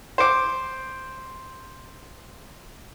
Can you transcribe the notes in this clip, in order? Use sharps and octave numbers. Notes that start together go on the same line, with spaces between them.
C5 D6